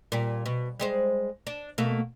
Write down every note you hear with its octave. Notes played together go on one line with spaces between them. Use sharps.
A#2 G3
B2
G3 G#3 C5
D4
B2 A3 A#3